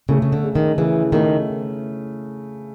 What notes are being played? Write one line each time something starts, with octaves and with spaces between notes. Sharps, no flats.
C#3 A3
C#3
D3
C#3
D#3
C#3 E3
D#3 A3